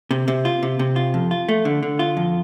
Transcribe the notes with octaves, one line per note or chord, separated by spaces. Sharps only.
C3
C3
F4
C3
C3
F4
F2
F4
A3
D3
D3
F4
F2